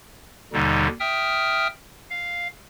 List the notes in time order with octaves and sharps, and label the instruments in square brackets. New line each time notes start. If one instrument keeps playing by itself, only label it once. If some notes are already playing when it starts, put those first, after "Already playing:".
[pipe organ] D#2 B2 D3 G3 D#4
E5 G5 D#6 F6
F5